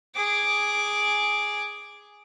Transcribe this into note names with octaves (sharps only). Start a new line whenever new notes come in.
G#4 D6